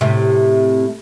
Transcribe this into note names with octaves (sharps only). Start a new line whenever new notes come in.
A2 C3